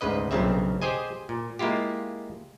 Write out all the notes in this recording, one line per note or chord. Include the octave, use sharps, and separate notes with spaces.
D2 G#2 C#3 B4 D#5
B1 G2 A#2 C#3 C4 E5
G4 G#4 C5 D#5 G#5
A#2
G#3 A#3 E4 F4 G4